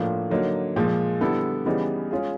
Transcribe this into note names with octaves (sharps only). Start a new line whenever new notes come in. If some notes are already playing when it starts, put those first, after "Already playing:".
Already playing: A2 F3 A#3 D4 F4
D3 F#3 A#3 D#4
A#2 F3 G#3
D3 G3 B3 E4 A4
C#3 E3 G3 B3 D#4
G#3 C#4 F4 G#4